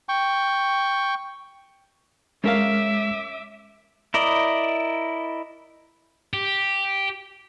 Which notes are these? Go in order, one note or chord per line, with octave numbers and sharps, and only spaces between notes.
G5 C#6
G#3 C#4 A#4 E5 F5 D6
E4 A#4 D5 D#5
G4